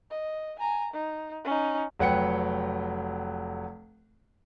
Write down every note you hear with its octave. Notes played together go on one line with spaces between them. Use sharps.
D#5
G#5 A#5
D#4
C#4 D#4
F1 F#3 B4 F#5 G5 C#7